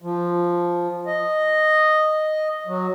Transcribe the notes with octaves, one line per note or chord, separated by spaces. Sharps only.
F3
D#5
F#3